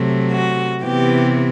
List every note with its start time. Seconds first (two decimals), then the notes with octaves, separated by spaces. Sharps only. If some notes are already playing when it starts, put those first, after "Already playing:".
Already playing: C3 F#3 A3
0.31 F#4
0.83 C3 E3 B3 G4